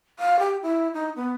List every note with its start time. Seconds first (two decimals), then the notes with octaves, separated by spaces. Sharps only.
0.19 F5
0.39 G4
0.63 E4
0.94 D#4
1.16 B3